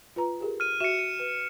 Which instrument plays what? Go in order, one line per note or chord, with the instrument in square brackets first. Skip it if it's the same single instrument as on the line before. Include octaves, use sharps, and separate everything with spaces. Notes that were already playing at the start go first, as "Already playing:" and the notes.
[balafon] F4 B4 A#5
G4 G#4 A#4
[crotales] F6 D#7
[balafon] F#4 E5 [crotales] C#7 E7
[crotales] D#7
[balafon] B4